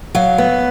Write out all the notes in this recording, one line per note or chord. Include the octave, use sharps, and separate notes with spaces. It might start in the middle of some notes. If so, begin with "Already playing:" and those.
F#3 F5
B3